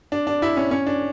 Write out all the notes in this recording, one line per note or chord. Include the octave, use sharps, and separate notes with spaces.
D4
D4
E4
C#4
C#4
D4